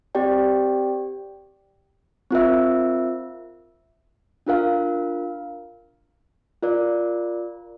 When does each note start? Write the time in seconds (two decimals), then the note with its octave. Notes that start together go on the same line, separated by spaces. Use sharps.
0.15 C4 G4 D5 G5
2.31 C4 F4 A#4 E5
4.46 D4 F4 A#4 F5
6.63 F4 A#4 D5